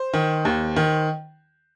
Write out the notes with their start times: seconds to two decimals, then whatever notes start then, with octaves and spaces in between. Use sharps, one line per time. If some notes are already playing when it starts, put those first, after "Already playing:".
Already playing: C5
0.14 D#3
0.45 D#2
0.76 D#3